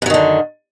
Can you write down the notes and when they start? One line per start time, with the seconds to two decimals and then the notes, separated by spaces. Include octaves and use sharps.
0.02 F#2
0.06 F#3
0.10 D#3
0.14 D3